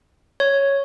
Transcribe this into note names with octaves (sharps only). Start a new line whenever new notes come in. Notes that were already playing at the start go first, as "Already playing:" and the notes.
C#5